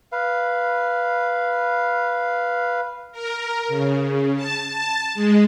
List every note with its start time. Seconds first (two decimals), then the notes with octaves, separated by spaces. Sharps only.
0.12 B4 F5
3.12 A#4
3.68 C#3
4.35 A5
4.70 A5
5.14 G#3